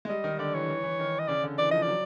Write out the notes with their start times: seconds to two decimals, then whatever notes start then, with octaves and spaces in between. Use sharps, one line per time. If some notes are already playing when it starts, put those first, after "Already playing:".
0.05 G#3
0.09 G3 D#5
0.24 D#3
0.39 D3 D5
0.54 E3 C#5
0.70 E3
0.83 E3
0.99 D#3
1.19 D#5
1.28 C#3 D5
1.44 D3
1.58 E3 D5
1.71 F3 D#5
1.82 D5
1.88 F#3